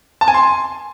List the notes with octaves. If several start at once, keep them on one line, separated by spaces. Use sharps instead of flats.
A5
G#5
C6